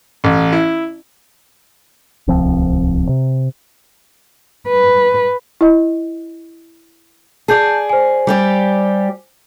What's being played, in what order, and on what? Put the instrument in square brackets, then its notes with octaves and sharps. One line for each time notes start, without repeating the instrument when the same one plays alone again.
[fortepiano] A1
E4
[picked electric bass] D1 C2 F3 C4
C3
[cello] B4
[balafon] E4 D#5
[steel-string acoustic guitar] G#4 D5 [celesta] A5 G6
[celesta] C5 G#5
[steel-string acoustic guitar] G3 G4 D5